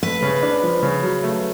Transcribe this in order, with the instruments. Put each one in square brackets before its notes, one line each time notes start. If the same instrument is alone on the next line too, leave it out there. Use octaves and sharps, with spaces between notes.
[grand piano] A3 [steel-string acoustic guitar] B4
[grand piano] C#3
D4
F3
C#3
F#3
A3